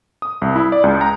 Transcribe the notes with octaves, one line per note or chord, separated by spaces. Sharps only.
D#6
C2
E4
D5
C#2
A#5